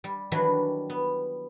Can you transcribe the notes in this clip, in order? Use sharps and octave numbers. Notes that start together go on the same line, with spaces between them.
G3
D#3 E3 F#3 G3 D4 B4
B3